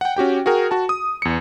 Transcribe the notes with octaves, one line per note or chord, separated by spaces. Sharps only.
F#5 G5
C#4 F#4 G4 G5
F#4 G#4 A#4 G5
F#4 A5
D#6
E2 C#7